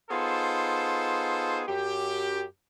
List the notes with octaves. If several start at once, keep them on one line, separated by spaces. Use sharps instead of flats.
B3 D#4 F4 G#4 A4 C5
F#2 G4